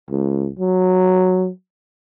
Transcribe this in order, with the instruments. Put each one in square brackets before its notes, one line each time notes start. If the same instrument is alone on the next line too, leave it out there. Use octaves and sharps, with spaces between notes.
[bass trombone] C#2
F#3